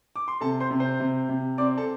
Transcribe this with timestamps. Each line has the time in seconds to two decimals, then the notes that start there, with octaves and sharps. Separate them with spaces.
0.16 D6
0.28 C6
0.41 C3 A4 A5
0.60 C5 C6
0.71 C3
0.80 C5 C6
1.00 C3
1.29 C3
1.58 C4 D5 D6
1.77 A4 A5